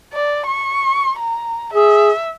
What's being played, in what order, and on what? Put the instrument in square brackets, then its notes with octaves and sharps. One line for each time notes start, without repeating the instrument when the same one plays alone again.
[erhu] D5
C#6
A#5
[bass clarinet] G#4 [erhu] E5